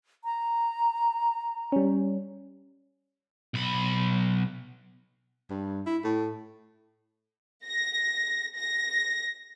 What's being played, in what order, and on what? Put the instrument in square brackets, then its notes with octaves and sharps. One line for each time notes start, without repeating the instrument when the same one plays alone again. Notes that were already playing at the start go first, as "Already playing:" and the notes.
[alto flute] A#5
[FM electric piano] G3 C#4
[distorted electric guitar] B1 B5
[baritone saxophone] G2
E4
A2
[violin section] A#6
A#6